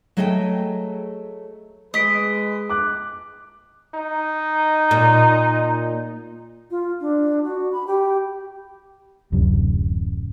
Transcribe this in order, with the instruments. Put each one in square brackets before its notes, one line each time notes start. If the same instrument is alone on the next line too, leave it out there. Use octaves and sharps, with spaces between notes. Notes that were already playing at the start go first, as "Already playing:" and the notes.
[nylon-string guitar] F#3 A3 G#4 D#5 F5 G5
[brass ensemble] G#3 B4 [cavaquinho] D#5 [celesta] D#6 B6 D7
[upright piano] D6 F#6
[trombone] D#4
[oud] A#2
[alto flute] F4
D4
F#4
B5
G4
[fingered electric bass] D1 F#2 C3